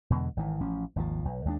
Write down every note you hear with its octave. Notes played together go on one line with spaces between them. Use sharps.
E2 B2 D3 G#3
G#1 D#3 E3
A1 F3 C#4
G#1 D#2 B2 F3
B1
D#2 G#3 A#3 D4